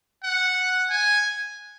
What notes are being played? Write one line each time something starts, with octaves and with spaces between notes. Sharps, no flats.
F#5
G#5